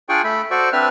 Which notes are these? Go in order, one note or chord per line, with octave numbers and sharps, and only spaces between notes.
D4 F4 G#4 D5 G5 C#6
A3 A4 B5
F#4 A4 C5 D5 C#6
C4 D4 B4 E5 F6